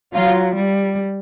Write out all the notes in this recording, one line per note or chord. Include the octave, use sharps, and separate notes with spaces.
F#3 F4
G3